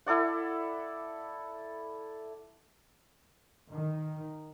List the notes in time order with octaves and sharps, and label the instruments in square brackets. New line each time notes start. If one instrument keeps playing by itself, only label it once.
[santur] E4 A4 D5 F#5
[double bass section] D#3